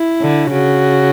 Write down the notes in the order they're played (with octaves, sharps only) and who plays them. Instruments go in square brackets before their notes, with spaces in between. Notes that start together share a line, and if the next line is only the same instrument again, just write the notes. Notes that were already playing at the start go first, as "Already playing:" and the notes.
Already playing: [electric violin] E4
[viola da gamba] D3
[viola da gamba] C#3 [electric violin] F#4